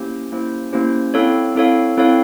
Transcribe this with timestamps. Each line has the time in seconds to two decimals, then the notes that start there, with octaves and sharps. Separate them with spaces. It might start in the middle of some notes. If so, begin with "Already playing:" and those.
Already playing: A#3 C#4 E4 G4 C5
0.32 A#3 C#4 E4 G4 C5
0.73 A#3 C#4 E4 G4 C5
1.14 C4 E4 A4 C#5 F5
1.55 C4 E4 A4 C#5 F5
1.98 C4 E4 A4 C#5 F5